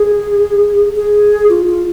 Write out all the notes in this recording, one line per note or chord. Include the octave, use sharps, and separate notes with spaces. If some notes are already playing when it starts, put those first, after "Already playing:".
Already playing: G#4
G#4
F4
F4